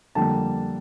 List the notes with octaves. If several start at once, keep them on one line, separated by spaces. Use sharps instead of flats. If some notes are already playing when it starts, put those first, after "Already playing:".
F2 D3 G3 A#3 A5